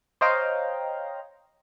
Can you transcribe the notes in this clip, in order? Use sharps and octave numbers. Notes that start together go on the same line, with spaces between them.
C5 C#5 D#5 F5 G5 A#5